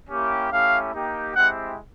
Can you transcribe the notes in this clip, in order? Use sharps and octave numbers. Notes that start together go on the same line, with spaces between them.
A#3 C#4 E4 G4
A3 C#4 E4 G4 F5
A#3 D#4 G4
G#3 C4 E4 G4 F#5